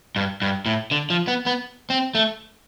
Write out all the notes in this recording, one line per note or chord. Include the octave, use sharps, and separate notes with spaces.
G2
G2
A2
D3
F3
B3
B3
C4
A3